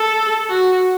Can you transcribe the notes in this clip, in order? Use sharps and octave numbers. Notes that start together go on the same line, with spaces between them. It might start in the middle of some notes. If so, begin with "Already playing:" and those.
Already playing: A4
F#4